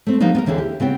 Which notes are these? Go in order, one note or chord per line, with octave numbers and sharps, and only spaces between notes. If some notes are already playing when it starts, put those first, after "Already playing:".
A3 C4
F3 G3 A#3 B3 D#4
B3 A#4
D#2 D3 E3 E4 G#4
G4
C#3 B3 C4 G5